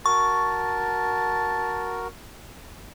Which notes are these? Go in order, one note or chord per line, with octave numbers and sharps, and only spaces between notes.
F#4 A#4 A5 C#6